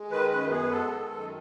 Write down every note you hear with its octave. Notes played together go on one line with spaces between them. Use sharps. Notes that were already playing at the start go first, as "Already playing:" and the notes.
Already playing: G#3
D#3 B4
F#2 B4
B3 G#4
B4
G#3 A4
D#3
F#2